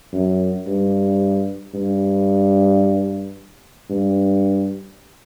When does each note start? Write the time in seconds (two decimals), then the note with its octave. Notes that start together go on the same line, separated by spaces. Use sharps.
0.13 F#2
0.67 G2
1.74 G2
3.90 G2